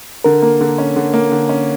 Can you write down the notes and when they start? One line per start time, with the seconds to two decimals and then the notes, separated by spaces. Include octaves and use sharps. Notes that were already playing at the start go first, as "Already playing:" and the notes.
0.24 D3 A#4
0.42 A#3
0.61 D3
0.78 C#4
0.96 D3
1.14 A#3
1.32 D3
1.49 C#4